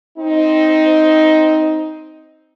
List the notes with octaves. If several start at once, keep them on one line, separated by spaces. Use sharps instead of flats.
C4 D#4